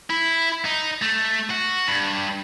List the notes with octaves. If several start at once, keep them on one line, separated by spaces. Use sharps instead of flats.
E4
D#4
A3
F#4
G2